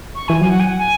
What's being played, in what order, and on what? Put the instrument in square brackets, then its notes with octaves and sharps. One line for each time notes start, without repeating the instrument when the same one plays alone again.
[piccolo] C#6
[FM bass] E3 [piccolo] G#5
[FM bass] F#3 [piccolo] G#5
[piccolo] F#5
G#5
F#5
G#5